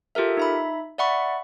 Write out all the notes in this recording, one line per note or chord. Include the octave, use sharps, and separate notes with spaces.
F4 G4 A4 A#4 E5
D#4 E5 B5
D5 E5 F#5 B5 C#6